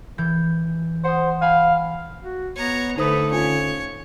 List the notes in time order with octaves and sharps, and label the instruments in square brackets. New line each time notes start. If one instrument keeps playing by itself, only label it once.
[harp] E3 G6
[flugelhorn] C5 [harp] F#5 D#6
[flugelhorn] F5 [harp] G#5 B5
[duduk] F#4
[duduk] B3 [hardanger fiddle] C#5 A#5
[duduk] D3 [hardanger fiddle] A3 B4 [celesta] D#4 C5 D#6
[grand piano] C#4 F4 G#5 [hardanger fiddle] C#5